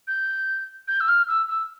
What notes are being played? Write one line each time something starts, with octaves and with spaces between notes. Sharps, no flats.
G6
G6
E6
F6
E6
E6